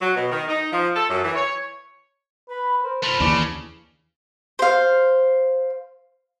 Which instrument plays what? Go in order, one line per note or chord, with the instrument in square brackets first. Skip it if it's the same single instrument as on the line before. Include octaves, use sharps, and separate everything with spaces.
[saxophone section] F#3
B2
D#3
D#4
F3
A4
F#2
E3
C#5
[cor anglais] B4 [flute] B5
[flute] A#4 [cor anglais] C5
[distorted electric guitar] A3 F4 [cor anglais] C5 [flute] B5
[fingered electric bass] D#2 E3 [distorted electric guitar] C#3 [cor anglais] D4
[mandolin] C5 F5